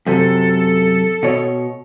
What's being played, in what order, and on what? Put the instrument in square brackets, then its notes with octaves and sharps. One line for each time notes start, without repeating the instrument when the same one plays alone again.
[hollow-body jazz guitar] F#2 C3 [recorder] A4
[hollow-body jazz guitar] B2 C#5